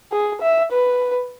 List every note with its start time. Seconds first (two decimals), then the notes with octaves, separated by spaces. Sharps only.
0.12 G#4
0.41 E5
0.72 B4